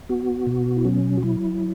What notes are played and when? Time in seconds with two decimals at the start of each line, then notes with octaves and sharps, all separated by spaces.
0.09 B3 F#4
0.47 B2
0.77 E4
0.85 F#3 C#4
1.17 F#4
1.23 F#3 E4